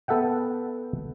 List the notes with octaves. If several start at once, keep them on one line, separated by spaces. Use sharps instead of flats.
B3 A4 E5 F#5 G5